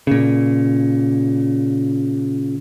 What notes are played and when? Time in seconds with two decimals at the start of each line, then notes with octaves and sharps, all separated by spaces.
0.07 A#2 C#3